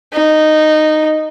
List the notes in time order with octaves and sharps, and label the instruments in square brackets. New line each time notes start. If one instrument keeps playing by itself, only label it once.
[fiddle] D#4